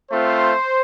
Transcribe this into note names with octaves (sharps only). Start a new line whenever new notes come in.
A3 C4 F4 C5